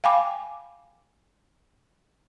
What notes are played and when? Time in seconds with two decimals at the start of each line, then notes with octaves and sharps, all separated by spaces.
0.04 F5 G5 G#5 B5 D6